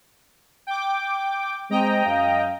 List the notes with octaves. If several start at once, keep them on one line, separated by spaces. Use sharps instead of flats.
G5 D6
G#3 C4 D#5 G5 A#5
F#2 F5